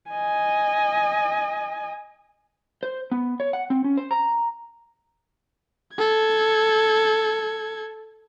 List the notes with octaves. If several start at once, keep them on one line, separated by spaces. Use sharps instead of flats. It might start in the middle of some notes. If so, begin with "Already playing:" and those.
D#5 G#5
C5
B3
C#5
F#5
C4
C#4
C5
A#5
A4 G#6